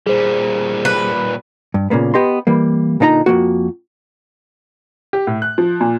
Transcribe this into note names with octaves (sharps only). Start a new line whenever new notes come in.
A#2 G3 G#4 C5
B4
G2
A#2 C#3 A#3 B3
B3 G4 D#5 C6
E3 G3 A#3
A#2 D3 D#4 D5 A#5
F2 E3 A#3 F#4
G4
A2
F#6
F3
A#2